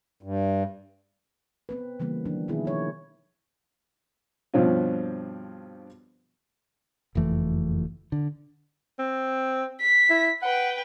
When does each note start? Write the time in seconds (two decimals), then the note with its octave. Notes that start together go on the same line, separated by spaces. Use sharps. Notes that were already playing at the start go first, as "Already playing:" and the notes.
0.23 G2
1.69 B3 C4 B4
2.00 C#3 E3 G3 A#3 C4
2.25 D#3 F3 F#3 D4
2.48 B2 D#3 B3 E4 G#4
2.65 F3 C#5
4.54 G2 B2 F3 C4 C#4 F4
7.15 F#1 F2 E3 A3
8.12 D3
8.99 C4
9.81 B6
10.10 E4
10.42 B4 F#5 G5